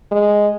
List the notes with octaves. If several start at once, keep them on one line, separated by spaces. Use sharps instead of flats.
G#3